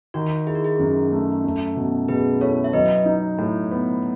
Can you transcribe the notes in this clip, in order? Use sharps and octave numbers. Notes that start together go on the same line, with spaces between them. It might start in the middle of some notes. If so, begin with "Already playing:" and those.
D#3 F#4
E4 G#4
F#4
G#4
F#2
A3
A3
B2
B2 G#4 B4
E4 A4 C#5
E5
F#3 B4 D#5
D#4
A2
B3